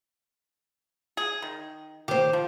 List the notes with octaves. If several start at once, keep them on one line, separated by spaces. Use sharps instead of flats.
G#4
D#3
D#3 G4 C5
F3